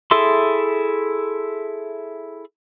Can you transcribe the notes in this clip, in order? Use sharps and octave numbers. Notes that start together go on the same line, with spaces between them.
E4 G#4 A4 E5 C6